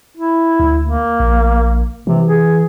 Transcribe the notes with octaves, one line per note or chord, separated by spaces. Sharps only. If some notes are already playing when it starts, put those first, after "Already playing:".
E4
D2
A#3
A#1
C3 E3
G#4